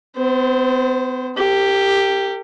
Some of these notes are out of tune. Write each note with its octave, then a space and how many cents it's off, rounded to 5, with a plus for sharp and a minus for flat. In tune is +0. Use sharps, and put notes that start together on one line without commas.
B3 +45 C5 +0
G4 +5 A#4 -45